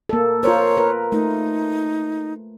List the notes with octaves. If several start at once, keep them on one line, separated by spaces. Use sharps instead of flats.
A#3 A4
F4 A#4 C5 C#5
A#4 B4
A3 D#4